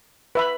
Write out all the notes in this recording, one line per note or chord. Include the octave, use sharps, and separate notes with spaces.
B4 E5 B5